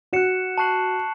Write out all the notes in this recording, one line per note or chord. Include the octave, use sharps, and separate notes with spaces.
F#4 F#6 C#7 E7
A5 C#6 F#6 C7 F#7